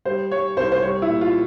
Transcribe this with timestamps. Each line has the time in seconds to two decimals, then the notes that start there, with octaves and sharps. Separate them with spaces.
0.05 G3 C5
0.31 G3 C#5
0.57 C2 C5
0.72 C5
0.82 G3 C#5
1.02 E4
1.08 A#2
1.21 F4